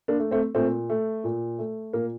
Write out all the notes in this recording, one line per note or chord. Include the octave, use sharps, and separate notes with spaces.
A#3 D4
A3
A3 C4
A#2 A3 C4
A3
A#2
A3
A#2 A#3